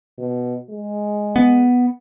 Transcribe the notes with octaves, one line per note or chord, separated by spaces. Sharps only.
B2
G#3
B3